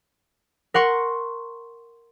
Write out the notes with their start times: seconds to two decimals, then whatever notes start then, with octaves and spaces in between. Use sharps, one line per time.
0.74 A#4 F#5 C6 C#6